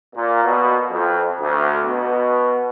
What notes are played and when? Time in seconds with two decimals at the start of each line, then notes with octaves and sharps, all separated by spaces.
0.15 A#2
0.45 B2
0.91 F2
1.40 D2
1.84 B2